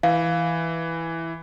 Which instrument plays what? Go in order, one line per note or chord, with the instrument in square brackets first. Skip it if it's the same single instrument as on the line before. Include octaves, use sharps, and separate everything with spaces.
[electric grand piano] E3 [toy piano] F5